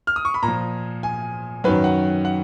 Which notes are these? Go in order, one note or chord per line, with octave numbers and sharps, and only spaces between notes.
F6
D#6
C#6
B5
A#2 A#5
F3
G#5
F#2 D#3 F#3 B4
F#5
F#5